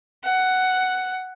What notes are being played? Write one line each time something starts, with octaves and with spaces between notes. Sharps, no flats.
F#5